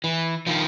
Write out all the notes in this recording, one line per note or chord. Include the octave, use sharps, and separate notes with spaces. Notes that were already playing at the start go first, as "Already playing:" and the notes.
E3
D#3 F3